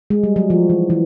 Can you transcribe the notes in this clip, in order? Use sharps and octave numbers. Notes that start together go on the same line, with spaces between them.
G#3
G3
F#3
F3
E3
E3